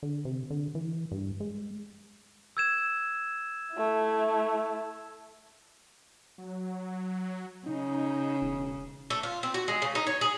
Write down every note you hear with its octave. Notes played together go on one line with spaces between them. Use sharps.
D3
C3
D3
E3
G2
G#3
E6 G#6 E7
A3 E4
F#3
C#3 D#4
E1
A3
F4
C4
F#4
G#3
C#3
D#4
C#5
G#4